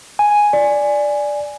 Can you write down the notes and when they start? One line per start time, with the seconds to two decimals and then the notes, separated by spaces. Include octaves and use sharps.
0.19 G#5
0.53 D5